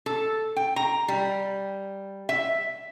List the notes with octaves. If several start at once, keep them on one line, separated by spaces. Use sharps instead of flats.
A4
G5
A#5
G3
E5